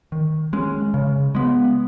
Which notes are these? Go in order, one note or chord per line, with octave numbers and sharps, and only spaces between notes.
D#3
G#3 C#4
C#3
G#3 B3